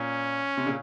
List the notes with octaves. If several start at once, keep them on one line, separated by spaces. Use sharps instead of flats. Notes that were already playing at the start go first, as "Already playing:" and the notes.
Already playing: A#2 C#4
C3
A#2 C#3